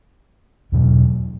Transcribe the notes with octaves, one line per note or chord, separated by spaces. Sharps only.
E2 B2 F#3